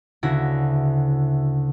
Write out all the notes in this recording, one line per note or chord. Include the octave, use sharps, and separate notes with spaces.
D2 C#3 E4 F#4 A#6